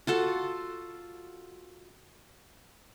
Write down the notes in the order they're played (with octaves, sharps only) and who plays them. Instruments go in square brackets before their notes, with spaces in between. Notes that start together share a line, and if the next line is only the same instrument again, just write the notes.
[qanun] F4 F#4 A4